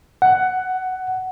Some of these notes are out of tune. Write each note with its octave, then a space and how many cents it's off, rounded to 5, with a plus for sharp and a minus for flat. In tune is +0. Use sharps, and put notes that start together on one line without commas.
F#5 +10